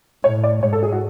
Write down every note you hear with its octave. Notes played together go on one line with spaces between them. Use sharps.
A2 C#5
D5
G#2 C#5
A4
G#4
F#4